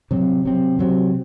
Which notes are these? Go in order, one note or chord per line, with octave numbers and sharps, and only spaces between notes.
C3 F#3 C4
C3 F#3 C4
C3 F#3 C4